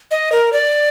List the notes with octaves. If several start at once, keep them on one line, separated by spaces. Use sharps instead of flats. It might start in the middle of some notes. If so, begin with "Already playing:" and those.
D#5
A#4
D5